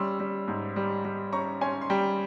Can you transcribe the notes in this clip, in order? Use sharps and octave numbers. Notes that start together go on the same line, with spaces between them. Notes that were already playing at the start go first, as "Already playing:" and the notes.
Already playing: G3 C#4 C6 E6
G3
G#2
G3
G3
C#4 A#5 C#6
C#4 G#5 C6
C6
G3 G5 A#5